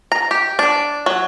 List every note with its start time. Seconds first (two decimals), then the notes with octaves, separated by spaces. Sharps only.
0.12 A#5
0.31 G4
0.59 D4
1.06 F#3